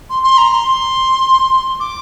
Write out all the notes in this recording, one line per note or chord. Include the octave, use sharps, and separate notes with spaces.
C6
C6
A#5
C6
D6